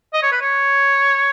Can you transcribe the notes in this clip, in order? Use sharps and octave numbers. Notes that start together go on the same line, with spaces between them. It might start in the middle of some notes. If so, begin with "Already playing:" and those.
D#5
C#5
B4
C#5